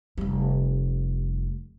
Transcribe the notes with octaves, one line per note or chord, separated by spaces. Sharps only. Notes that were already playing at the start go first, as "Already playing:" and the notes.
F1 G3